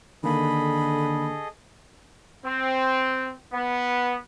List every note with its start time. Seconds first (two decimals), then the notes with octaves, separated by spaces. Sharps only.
0.24 D3 D#3 A#3 G#4 A4 D#5 B5
2.45 C4
3.52 B3